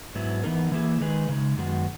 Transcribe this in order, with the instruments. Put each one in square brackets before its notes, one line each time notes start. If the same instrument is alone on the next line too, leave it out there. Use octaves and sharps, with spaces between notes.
[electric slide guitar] G#2 F#3 B3 E4
E3 B3 D#4 A#4
E3 A#3 E4 G#4
D#3 G#3 D#4 G#4 B4
C#3 G#3 D#4
F#2 D#3 G#3 B3 F#4